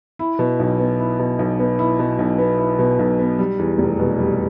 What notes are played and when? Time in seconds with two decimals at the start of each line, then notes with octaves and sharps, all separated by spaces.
0.19 E4
0.39 B2
0.60 B1
0.79 B3
0.99 E4
1.19 B2
1.39 B1
1.59 B3
1.79 E4
1.99 B2
2.19 B1
2.38 B3
2.59 E4
2.79 B2
2.99 B1
3.19 B3
3.39 G3
3.59 E2
3.78 F1
3.99 B2
4.18 G3